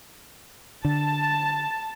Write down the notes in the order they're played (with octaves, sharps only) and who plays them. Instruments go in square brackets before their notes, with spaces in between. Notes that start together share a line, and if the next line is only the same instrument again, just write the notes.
[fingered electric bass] D3 [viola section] A5